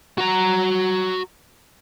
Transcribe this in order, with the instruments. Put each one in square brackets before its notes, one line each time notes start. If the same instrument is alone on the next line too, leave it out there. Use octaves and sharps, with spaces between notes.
[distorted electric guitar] F#4 A#5